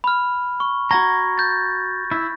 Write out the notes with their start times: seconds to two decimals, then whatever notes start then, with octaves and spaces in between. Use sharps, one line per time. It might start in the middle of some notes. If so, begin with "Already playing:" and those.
0.04 B5 F6
0.60 C#6
0.91 F#4 F#5 A#5 C#6 G#6 A#6
1.38 G6 A6
2.11 E4